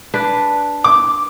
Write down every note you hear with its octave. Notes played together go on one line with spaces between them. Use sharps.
D4 B4
D6